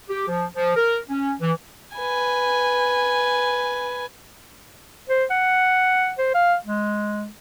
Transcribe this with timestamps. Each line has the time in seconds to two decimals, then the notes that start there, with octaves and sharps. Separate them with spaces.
0.08 G4
0.28 F3
0.54 F3
0.76 A#4
1.09 C#4
1.41 E3
1.95 B4 G#5
5.09 C5
5.31 F#5
6.18 C5
6.35 F5
6.66 G#3